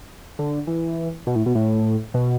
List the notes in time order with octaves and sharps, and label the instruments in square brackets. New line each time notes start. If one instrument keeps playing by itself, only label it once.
[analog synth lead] D3
E3
B2
A2
B2
A2
B2